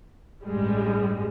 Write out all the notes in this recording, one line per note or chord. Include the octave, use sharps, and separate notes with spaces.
A1 G2 G3 G#3